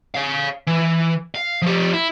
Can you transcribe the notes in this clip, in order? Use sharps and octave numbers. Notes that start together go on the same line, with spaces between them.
C#5 F5
E3
F5
F3 G4
E4